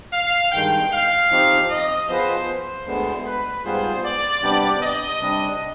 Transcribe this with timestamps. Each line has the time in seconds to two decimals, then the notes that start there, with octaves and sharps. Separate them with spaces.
0.13 F5
0.52 G2 D#3 G#3 G5
0.91 F5
1.30 F3 C4 D#4 G4
1.70 D#5
2.09 F3 B3 F4 G#4 B4 C5
2.48 C5
2.86 D2 D3 G#3 B3
3.25 B4
3.65 G#2 G3 B3 F4 G#4 C5
4.04 D5
4.42 C3 G3 B3 D4 G4 D5
4.82 D#5
5.21 C3 G3 D4